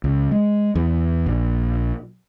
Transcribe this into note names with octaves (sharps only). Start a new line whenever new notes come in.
C#2
G#3
E2
A#1